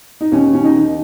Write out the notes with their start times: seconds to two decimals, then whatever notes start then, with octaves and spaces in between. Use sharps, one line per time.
0.21 D#4
0.32 D#2 C#4
0.53 D#2 C#4
0.64 D#4
0.75 D#3